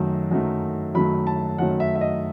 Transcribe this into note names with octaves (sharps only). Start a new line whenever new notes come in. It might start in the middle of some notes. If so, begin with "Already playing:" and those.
Already playing: F#2 D#3 F#3 A3
F#2 D#3 F#3 A3
F#2 D#3 F#3 A3 B5
A5
F#2 D#3 F#3 A3 F#5
E5
E5
D#5